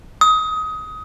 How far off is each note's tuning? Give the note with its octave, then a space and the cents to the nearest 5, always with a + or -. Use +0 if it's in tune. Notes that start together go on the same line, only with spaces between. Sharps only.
D#6 +20